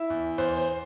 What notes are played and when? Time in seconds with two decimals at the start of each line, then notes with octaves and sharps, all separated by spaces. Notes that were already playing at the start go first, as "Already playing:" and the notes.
Already playing: E4 E5
0.10 E2
0.38 E2 C5
0.57 C5